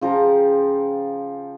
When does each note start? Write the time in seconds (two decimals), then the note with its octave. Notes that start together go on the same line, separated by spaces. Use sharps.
0.01 C#3 F3 G5 A#5